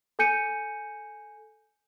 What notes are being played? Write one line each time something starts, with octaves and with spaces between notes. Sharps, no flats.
A4 G#5 G6 C#7 D#7